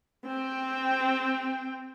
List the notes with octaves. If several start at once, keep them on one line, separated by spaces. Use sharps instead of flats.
C4 G5